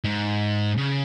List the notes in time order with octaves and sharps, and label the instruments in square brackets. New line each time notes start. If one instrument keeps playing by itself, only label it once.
[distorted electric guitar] G#2
C#3